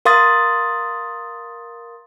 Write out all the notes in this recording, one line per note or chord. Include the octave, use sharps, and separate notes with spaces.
A#4 F5 C6 D#6 A6